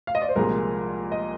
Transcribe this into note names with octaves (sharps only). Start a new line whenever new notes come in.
F5
D#5
D5
C5
C2 A#2 F3 G#3 A#4
D#5